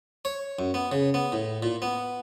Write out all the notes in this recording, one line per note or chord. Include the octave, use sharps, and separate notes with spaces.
C#5
F#2
B3
C#3
B3
A2
A#2
B3